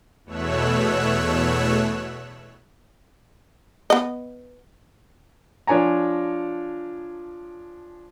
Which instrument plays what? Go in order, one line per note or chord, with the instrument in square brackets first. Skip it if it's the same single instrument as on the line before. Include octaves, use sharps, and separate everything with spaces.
[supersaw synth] E2 B2 A3 C#5 E6 F#6
[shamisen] B3 D#5
[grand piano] F3 D4 C#5 G#5 A#5